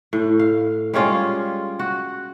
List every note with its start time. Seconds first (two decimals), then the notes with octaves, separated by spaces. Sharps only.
0.13 A2
0.39 F5
0.94 G3 G#3 C#4 F4
1.79 F#4